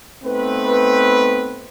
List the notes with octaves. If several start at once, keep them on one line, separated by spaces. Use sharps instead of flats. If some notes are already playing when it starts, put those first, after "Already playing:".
A3 B3 C4 D#4 B4